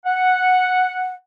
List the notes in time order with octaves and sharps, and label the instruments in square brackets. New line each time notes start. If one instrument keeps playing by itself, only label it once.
[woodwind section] F#5